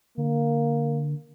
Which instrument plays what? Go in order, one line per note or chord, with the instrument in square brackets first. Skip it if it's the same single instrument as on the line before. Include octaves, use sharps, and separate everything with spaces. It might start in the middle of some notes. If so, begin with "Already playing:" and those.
[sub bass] D3 [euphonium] A#3